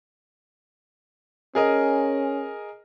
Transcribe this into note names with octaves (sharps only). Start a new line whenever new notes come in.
C#4 G#4 A#4 D#5